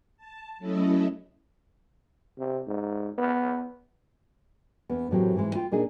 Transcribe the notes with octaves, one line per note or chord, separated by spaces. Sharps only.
A5
F#3 A3 C#4 E4 A4 D#5
C3
G#2
B3
E2 B3
A2 E3 F#3 C4 G4 A#4
G#2 E3 G#3
F4 G5
A#2 D4 D#4 G#4